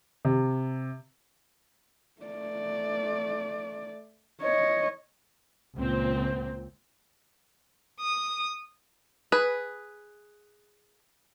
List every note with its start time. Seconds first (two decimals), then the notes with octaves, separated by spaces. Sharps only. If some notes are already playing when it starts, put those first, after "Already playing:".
0.25 C3
2.22 A3 D5
4.42 C#5 D#5
5.77 C#2 A#2 C4
7.99 D#6
9.32 G#4 B4